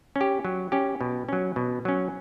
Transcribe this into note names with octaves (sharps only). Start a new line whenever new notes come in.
C#4
G4
F#3
C#4 G4
B2
F#3 C#4
B2
F#3 C#4